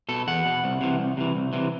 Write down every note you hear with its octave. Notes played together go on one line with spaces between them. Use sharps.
B2 A4
E2 F#5
B2
C2
C3 E3
C2
C3 E3
C2
C3 E3